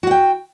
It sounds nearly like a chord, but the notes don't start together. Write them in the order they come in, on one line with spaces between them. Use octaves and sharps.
F#4 F#5 G5